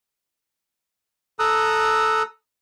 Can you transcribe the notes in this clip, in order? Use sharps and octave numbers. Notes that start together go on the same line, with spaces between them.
A4 A#5 D#6 E6 F#6